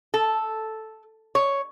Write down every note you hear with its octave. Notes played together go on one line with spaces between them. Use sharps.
A4
C#5